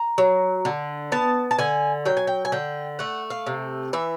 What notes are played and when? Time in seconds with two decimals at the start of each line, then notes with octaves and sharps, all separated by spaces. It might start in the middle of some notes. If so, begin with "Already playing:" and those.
Already playing: A#5
0.18 F#3
0.65 D3
1.12 B3 A5
1.51 A5
1.59 D3 G#5
2.06 F#3 G5
2.17 G#5
2.27 G5
2.45 G#5
2.52 D3 G5
2.99 A3 F#5
3.30 F5
3.46 C3
3.93 E3 E5